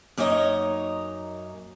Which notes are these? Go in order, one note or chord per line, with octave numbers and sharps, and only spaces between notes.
F#2 A#3 D#4 C#5 D#5